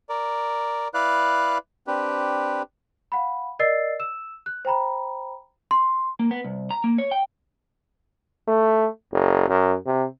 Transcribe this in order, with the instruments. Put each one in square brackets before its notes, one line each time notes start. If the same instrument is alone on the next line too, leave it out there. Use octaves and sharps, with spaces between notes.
[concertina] A#4 D5
E4 B4 D5 F5 F#6
C4 D4 G4 B4
[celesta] F5 F#5 B5
A#4 D5 D#5 E6 A6 C7
E6 E7
F#6
C5 G5 A#5 B5
C6
[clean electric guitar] A#3
B3
C2
A#5
A#3
C#5
G5
[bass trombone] A3
F#1
F#2
C3